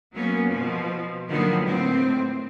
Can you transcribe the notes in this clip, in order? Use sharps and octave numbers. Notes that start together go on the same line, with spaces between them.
F#3 A#3 B3 C#4
B2 F3
D3 D#3 F3 F#3 A#3 B3
A2 C4